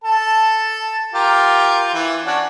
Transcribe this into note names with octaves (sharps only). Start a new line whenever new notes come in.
A4 A5
F4 G4 A#4
E3
C#4 D4 F#4